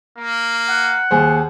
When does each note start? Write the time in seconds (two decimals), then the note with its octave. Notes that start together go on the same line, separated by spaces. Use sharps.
0.18 A#3
0.69 F#5
1.11 D#2 G#4 C5